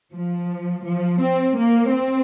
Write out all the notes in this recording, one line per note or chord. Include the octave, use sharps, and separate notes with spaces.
F3
F3
C4
A#3
C4